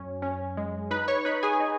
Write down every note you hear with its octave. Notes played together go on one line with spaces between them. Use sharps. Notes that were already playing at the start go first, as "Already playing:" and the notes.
Already playing: F#2 C#4
C#4
G#3
D#4 B4 B5
C#5 C#6
D#4 B4 B5
G#4 G#5
D#4